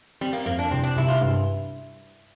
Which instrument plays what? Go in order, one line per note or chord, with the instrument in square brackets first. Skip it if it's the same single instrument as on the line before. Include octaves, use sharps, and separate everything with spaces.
[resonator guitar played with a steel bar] G3 [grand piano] C4
[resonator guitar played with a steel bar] A#3
[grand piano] F2 [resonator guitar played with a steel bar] A#3
[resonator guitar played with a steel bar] D4
[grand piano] C2 [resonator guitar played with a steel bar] C4
[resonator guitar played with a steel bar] D4
[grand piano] C2 [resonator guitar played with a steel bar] E4
[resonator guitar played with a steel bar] F4
[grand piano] G2